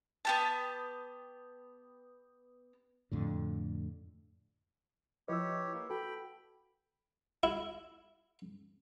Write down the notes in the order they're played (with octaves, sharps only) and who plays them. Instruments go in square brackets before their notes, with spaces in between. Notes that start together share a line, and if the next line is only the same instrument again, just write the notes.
[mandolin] B3 G4 A5
[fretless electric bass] F2 A2 D3
[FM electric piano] F3 E4 D#5 [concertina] G4 C#5 [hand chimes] B4 E6
[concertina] A#3
[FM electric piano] F#4 A4 [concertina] G5 B5
[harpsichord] E4